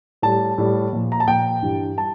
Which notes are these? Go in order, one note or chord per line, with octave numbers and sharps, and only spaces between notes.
A2 G3 A5
A2 G3
A#2 F3
A#5
A5
A#2 F3 G5
G2 E3 G3
G3 A5